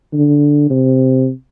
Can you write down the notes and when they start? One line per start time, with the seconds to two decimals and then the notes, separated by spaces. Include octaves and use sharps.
0.13 D3
0.70 C3